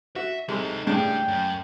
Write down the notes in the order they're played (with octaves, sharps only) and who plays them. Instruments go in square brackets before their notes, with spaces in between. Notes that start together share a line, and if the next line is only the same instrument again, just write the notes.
[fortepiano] F#4 [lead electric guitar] E5
[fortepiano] C3 G3 [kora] G#3 [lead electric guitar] D#4 A4
[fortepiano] A2 C#3 [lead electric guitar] D4 G4 [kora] G#4 D5 [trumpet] G5
[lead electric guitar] F#2